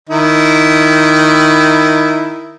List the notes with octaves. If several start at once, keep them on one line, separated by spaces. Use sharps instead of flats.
D#3 E4